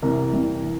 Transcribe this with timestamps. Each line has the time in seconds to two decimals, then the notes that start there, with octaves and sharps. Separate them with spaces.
0.02 C2 C3 E3 G3 A#4
0.33 C2 C3 E3 G3
0.64 E3